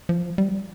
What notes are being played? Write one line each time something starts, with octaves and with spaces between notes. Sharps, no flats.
F3
G3